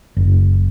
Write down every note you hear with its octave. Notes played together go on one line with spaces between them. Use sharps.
F#1